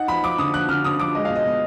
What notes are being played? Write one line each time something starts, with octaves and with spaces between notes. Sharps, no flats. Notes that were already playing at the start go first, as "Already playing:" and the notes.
Already playing: D#4 F#5
F3 B5
F3 D6
D3 D#6
F3 F#6
D3 F6
D3 D#6
F3 D6
G#3 D#5
B2 F5
D#5
B2